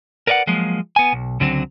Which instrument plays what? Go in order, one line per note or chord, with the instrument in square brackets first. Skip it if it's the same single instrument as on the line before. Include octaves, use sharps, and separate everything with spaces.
[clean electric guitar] A#4 B4 D5 E5 F#5
F3 F#3 G#3 A#3
B3 G#5
B1
C#2 D3 F#3 C4